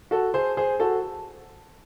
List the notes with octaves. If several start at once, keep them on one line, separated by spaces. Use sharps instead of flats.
F#4 A4
G#4 C5
G#4 C5
F#4 A4